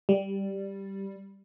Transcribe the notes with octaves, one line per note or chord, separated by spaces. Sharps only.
G3